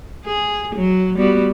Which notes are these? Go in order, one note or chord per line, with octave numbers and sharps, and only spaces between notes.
G#4
F#3
G3 B3 F#4